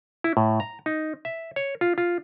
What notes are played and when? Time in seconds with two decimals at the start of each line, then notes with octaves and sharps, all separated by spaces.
0.24 E4
0.37 A2
0.60 A#5
0.86 D#4
1.25 E5
1.56 C#5
1.81 F4
1.98 F4